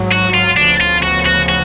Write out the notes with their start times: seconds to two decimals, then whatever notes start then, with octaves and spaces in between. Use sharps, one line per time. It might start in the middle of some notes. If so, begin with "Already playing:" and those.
Already playing: G#1 G#2 F#3
0.12 F#4
0.34 F4
0.57 D2 C#3 F3 B3 D4
0.81 F4
1.02 F#4
1.26 F#4
1.49 F#4